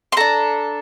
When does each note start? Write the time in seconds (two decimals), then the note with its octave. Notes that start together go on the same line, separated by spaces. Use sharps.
0.12 C6
0.17 D4 A4 A#5